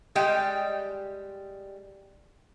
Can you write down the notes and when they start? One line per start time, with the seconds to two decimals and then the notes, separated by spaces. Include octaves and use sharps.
0.15 G3 G#3 G4 D#5 G5